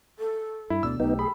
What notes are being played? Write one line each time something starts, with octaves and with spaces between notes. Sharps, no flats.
A4
G2 E4
D2 B2 D3 D5 E6
B1 A3 B3 D#4 G4
G#4 B5